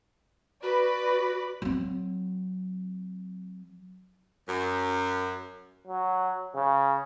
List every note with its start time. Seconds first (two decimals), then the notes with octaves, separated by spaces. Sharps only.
0.63 F#4 B4 D5 B5
1.62 F#3 C4
4.48 F#2
5.87 F#3
6.56 C#3